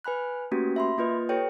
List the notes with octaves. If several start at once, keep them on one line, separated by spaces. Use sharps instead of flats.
B4 G#5 B5 F#6
A3 A#3 C#4 F#4 G4 B4
E5 B5 C6
A#3 F4 B4 D#5
G4 A4 B4 C#5 G5